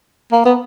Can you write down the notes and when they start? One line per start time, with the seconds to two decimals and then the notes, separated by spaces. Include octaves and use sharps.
0.32 A#3
0.45 B3